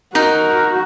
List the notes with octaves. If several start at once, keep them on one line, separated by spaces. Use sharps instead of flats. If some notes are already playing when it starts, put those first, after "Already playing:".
D#4 F#4 A#4